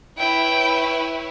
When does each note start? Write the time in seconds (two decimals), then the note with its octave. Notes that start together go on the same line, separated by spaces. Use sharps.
0.18 E4 B4 C#5 G5